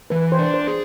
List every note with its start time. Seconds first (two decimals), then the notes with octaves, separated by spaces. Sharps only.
0.10 E3 B4
0.32 C5
0.39 D4
0.54 C5
0.67 G#4